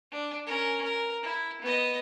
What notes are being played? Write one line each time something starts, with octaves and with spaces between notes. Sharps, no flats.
D4
C#4 A#4
A#4
E4
B3 D#5